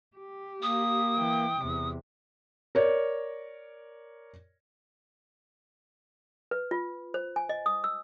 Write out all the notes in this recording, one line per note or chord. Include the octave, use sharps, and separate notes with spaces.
G4
A#3 D#6
E3 G5
E2 C3
A#4 C#5 D5
B4
F4
C5
G#5
D#5
D#6
E6